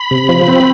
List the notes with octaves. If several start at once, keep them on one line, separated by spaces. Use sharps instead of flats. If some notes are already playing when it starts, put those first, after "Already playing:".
Already playing: B5
C3
F3
C4